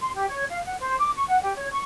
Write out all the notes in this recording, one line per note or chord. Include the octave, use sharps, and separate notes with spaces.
C6
G4
C#5
F5
F#5
C5
D6
C#6
F#5
G4
C#5
C#6